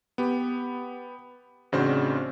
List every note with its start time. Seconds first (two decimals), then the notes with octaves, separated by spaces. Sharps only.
0.18 B3 G4
1.72 A1 C#3 C4 D4 F#4 C5